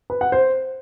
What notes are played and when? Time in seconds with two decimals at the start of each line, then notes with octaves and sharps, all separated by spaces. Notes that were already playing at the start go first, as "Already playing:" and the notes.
0.10 B4
0.21 F#5
0.32 C5